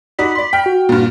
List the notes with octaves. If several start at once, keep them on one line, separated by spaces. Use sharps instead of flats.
D#4 F#4 D5 B5
D5 C6
G5 F6
F#4
G2 A#2